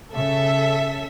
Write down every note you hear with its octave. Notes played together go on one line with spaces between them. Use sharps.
C#3 A4 E5